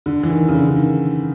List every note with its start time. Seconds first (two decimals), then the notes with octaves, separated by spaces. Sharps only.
0.06 D3
0.23 E3
0.30 D#3
0.49 C#3
0.53 D3
0.69 D3
0.76 D#3